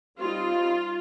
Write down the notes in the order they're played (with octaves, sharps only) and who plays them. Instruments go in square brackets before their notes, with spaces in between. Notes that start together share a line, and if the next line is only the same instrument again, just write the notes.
[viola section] G3 C4 D#4 F4